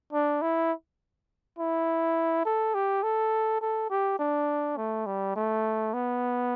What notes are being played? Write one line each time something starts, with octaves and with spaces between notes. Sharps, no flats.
D4
E4
E4
A4
G4
A4
A4
G4
D4
A3
G3
A3
B3